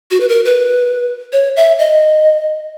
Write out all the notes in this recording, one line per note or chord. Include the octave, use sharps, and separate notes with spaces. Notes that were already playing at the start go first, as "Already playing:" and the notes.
F#4
B4
A#4
B4
C#5
E5
D#5